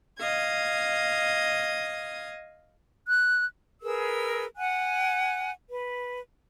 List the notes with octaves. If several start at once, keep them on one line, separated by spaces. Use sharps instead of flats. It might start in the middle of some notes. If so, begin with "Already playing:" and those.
D#5 F5 D#6 G#6
F#6
G#4 A#4 B4 E6
F#5 G#5 F#6
B4